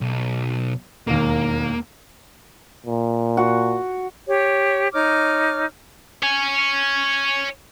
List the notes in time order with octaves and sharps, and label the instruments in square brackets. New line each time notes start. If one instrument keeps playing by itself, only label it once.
[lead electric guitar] B1
[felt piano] E1 D#2 [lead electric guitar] A#3
[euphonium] A#2
[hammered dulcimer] F#4
[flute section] G4 C#5
D#4 C#5 D6 F6
[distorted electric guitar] C#5 G#5